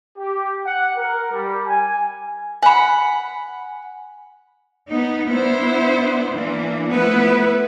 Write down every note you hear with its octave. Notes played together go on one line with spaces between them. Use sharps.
G4
F#5
A#4
G3
G#5
F#5 G#5 B5
B3 D#4
B3 D4 E4 C5
E3 A#3 D4
F3 A3 B3 E4 B4